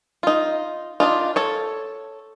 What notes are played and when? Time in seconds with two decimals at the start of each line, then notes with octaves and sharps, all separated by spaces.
0.23 D#4 F4
1.00 D4 D#4 F4
1.36 A4 C#5